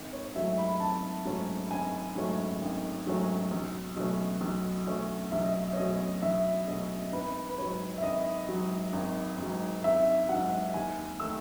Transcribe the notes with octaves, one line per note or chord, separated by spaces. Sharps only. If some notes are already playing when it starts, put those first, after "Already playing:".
Already playing: G#1
C#5
G#2 F#3 A3 C#4 E5
B5
G#1 A5
G#2 F#3 A3 C#4
G#1 G#5
G#2 F#3 A3 C#4
G#1
G#2 F#3 A3 C#4
B1
B2 F#3 A3 C#4
B1
B2 F#3 A3 C#4
B1 E5
D#5
E5
C#5
B2 F#3 A3 C#4 D#5
B1 E5
B2 F#3 A3 C#4 D#5
G#1 B4
B4
G#2 F#3 C#5
E5
G#1 D#5
G#2 F#3
G#1
G#2 F#3
G#1 E5
G#2 F#3 F#5
D#2 G#5
D#3 A3 E6